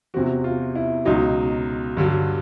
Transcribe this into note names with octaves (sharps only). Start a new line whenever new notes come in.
E2 C3 F3 F#4
F4
E4
C#2 B2 F#3 D#4
G2 D3 F#3